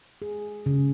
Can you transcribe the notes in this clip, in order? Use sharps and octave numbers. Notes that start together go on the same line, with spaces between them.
G#4
C#3